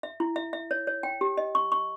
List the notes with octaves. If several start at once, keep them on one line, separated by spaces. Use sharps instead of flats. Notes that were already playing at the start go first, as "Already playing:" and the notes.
E5
E4
E5
E5
C#5
C#5
G5
G4
D#5
C#6
C#6